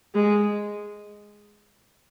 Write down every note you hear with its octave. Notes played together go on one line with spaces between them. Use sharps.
G#3